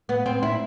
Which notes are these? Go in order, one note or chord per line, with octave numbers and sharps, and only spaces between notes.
B3
C4
E4